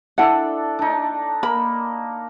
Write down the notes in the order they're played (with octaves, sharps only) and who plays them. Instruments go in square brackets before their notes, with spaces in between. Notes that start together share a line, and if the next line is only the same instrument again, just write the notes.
[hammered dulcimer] D4 A4 D5 [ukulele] E4 F#5
[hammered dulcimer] D4 D#4
[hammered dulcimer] A#3 [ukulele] B5